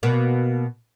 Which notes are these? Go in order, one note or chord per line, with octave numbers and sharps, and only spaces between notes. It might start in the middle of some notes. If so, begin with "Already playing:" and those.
B2 A#3